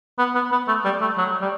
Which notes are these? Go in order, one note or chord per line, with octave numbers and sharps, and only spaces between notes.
B3
B3
B3
A3
G3
A3
F#3
G3